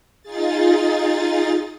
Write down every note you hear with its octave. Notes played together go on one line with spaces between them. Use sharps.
D#4 F4 G#4 A6